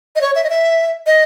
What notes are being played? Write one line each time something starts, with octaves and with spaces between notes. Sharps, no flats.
D#5
C#5
E5
D#5
E5
D#5